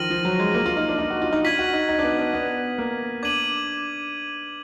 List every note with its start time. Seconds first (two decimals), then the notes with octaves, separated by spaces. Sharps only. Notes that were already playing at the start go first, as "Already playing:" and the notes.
Already playing: D#3 F3 F6 A#6 D#7 F#7
0.10 F3
0.25 F#3
0.39 G#3
0.54 A#3
0.66 F4
0.77 D#4
0.89 D4
0.99 D#4
1.10 F#4
1.22 F4
1.33 D#4
1.44 F4 G#6 B6 D#7 F#7
1.59 F#4
1.73 D#4
1.89 D#4
1.99 D4
2.03 B3
2.19 D4
2.33 B3
2.78 A#3
3.23 D4 D6 G#6 D#7 F#7